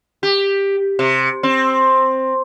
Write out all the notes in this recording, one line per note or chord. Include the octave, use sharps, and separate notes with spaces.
G4
C3
C4